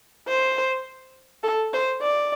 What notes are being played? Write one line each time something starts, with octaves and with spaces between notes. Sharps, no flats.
C5
A4
C5
D5